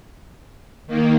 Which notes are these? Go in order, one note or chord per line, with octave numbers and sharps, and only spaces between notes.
D#3 A#3